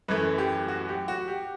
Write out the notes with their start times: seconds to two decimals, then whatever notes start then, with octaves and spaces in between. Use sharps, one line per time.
0.08 F#2 E3 A3 B4
0.38 G4
0.68 F#4
0.89 G4
1.08 F#4
1.28 G4